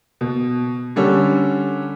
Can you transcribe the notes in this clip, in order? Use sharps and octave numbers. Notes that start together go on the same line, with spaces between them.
B2
D3 G3 C#4 A4